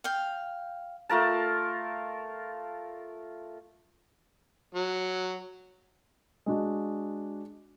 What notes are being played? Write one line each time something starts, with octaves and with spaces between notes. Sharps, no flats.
F5 G5
A3 F4 A#4 A5
F#3
G#3 D4 F#4